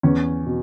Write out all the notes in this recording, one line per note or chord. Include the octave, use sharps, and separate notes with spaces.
E2 C#4
B2